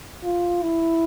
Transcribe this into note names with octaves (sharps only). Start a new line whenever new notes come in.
F4
E4